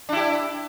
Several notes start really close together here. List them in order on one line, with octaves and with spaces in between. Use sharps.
D4 E4 G4